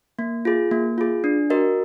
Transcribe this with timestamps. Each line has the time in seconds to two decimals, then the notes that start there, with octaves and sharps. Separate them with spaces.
0.19 A#3
0.45 F4 G#4
0.71 A#3
0.98 F4 G#4
1.24 D4
1.50 F#4 A#4 D#5